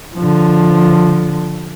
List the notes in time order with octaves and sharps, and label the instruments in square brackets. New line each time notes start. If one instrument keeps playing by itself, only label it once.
[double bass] D3 F3